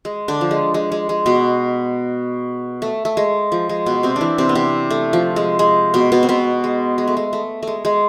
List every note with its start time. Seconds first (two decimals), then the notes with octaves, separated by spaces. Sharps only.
0.05 G#3
0.28 D3 D4
0.41 F3
0.51 G#3
0.74 G#3
0.92 G#3
1.09 G#3
1.26 B2 B3
2.82 A3
3.05 A3
3.17 G#3
3.52 F3
3.69 G#3
3.86 B2 B3
4.03 C3 C4
4.16 E3 D4 E4
4.38 C3 C4
4.49 B3
4.55 C3 C4
4.90 A3
5.13 F3
5.36 G#3
5.59 G#3
5.94 B2 B3
6.12 B2 B3
6.23 C4
6.29 B2 B3
6.64 G#3
6.98 G#3
7.07 A3
7.17 G#3
7.33 A3
7.63 G#3 A3
7.85 G#3